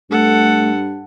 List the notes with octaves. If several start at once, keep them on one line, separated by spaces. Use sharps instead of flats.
G2 A3 A4 F#5